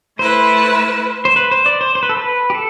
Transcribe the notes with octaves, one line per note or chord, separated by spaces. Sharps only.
A3 E4 B4 C5
C5
B4
C5
D5
C5
C5
B4
A4
B4
G4
A4